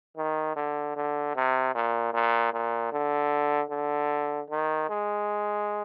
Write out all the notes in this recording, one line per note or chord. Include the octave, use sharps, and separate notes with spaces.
D#3
D3
D3
C3
A#2
A#2
A#2
D3
D3
D#3
G#3